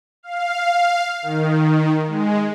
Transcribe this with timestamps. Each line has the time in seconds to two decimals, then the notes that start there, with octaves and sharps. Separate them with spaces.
0.23 F5
1.22 D#3
2.07 G#3